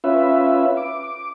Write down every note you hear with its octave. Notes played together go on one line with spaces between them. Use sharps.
C#4 F4 B4 E5
D6
D6